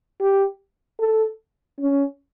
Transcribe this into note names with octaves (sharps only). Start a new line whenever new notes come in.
G4
A4
C#4